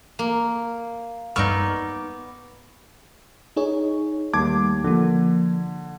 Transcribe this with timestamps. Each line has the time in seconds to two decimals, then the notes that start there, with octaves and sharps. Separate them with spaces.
0.19 A#3
1.36 G2 B3 D#4 D5 C#6 E6 F6
3.56 D#4 G#4 C#5
4.33 D#2 G3 A3 A5 D6 G#6
4.84 D3 F3 A#3